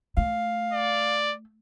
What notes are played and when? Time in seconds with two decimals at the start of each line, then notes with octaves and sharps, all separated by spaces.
0.17 A3 F5
0.73 D5